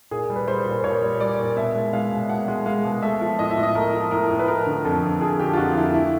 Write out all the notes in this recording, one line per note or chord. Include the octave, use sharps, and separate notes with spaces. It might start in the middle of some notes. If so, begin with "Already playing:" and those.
A#2 G#4
G3
B4
G3 C5
A#2
C5
A#2 C#5
G3
G3 D5
A#2
B2 E5
G#3
G#3 F5
B2
B2 F#5
G#3
G#3 F5
B2
A3 E5
F3
A2 D#5
E5
A2
D#5
A3 A#4
F3
A2 A#4
A2
B4
F3 A#4
D3
F2 A4
F2
F3 G#4
D3 G4
F4
F2 F#4
F2 E4
A3 E4